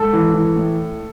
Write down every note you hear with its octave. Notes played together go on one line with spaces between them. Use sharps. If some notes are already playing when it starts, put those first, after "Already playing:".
Already playing: G#2 A4
E3
E3
A2